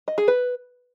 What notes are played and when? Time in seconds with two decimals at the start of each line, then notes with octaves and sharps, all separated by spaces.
0.08 D#5
0.18 G#4
0.28 B4